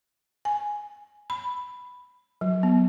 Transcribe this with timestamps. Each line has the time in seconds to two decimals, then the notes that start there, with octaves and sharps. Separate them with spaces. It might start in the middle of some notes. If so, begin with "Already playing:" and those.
0.45 G#5
1.30 B5
2.41 F#3
2.63 B3